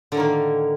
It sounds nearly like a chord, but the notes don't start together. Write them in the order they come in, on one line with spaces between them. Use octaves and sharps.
D3 A2 D#3 A#3